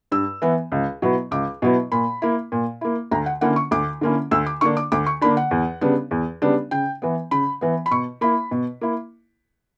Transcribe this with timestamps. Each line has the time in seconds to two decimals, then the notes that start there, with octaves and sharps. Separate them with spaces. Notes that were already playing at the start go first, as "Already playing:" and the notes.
0.12 G2 E6
0.42 E3 B3
0.72 C#2
1.02 B2 F#3 B3 E4
1.31 C#2 D6
1.62 B2 F#3 B3 E4
1.92 A#2 B5
2.22 A#3 E4
2.52 A#2
2.81 A#3 E4
3.11 D2 A#5
3.26 F#5
3.41 D3 A#3 C#4 E4 F#5
3.56 C#6
3.71 D2 D6
4.01 D3 A#3 C#4 E4
4.31 D2 E6
4.46 D6
4.61 D3 A#3 D4 C#6
4.77 D6
4.92 D2 D6
5.06 C#6
5.21 D3 A#3 D4 B5
5.37 F#5
5.51 E2
5.81 C#3 G3 B3 D4
6.11 E2
6.42 C#3 G3 B3 D4
6.71 C#3 G5
7.02 E3 B3
7.31 C#3 B5
7.61 E3 B3
7.86 B5
7.91 B2 C#6
8.21 A#3 E4 B5
8.51 B2
8.81 A#3 E4